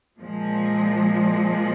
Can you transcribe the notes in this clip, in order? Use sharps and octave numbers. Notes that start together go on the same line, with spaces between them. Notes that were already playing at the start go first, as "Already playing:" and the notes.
A#2 F3 G#3